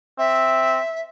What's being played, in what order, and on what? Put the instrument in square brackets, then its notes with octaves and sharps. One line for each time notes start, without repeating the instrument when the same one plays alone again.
[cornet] C4 [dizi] E5